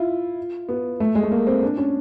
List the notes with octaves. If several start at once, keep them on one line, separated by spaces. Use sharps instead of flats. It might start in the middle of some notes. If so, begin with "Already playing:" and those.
Already playing: E4 F4
B3
A3
G#3
A3
A#3
C4
D4
C#4